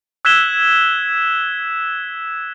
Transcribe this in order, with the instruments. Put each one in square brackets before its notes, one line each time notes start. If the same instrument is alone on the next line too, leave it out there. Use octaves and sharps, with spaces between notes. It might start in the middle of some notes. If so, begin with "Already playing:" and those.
[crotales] E6 F#6 G#6 B6 E7 G7